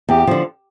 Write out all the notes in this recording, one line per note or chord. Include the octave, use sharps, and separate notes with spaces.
E2 G4
D3 F3